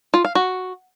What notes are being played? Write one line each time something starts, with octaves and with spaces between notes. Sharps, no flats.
F4
F5
F#4